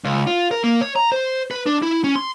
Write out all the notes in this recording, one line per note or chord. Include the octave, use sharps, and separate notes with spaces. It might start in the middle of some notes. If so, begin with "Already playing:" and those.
C#2
F4
A#4
A#3
C#5
A#5
C5
B4
D4
E4
C#4
C6